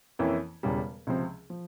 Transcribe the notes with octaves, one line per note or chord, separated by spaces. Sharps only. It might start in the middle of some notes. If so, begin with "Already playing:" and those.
F2 E3 A#3 C#4 E4
E1 E2 C#3 G3
C#2 C3 F3 C4
F3